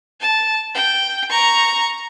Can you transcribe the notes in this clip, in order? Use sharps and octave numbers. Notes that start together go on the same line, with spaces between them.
A5
G5
A#5 C#6